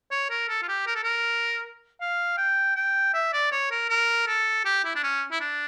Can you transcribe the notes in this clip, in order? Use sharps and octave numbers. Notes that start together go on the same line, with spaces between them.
C#5
A#4
A4
F4
G4
A#4
A4
A#4
F5
G5
G5
E5
D5
C#5
A#4
A#4
A4
G4
E4
D4
C#4
E4
D4